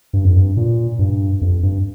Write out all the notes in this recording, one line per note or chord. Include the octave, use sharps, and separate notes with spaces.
G2
F2
G2
A#2
G2
F2
G2